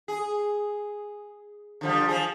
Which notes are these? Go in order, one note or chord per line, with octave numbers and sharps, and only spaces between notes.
G#4
D3 F3 G3
F3 G#4